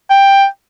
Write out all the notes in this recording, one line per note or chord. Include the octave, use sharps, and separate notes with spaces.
G5